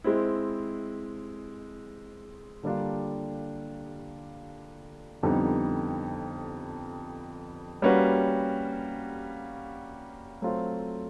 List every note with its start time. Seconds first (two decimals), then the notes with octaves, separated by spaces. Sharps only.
0.04 G#3 C4 E4
2.63 D3 G3 A#3 D4 F4
5.23 F2 D3 G3 B3 D#4
7.82 G3 A#3 C#4 F#4 B4
10.42 F#3 A3 C4 F4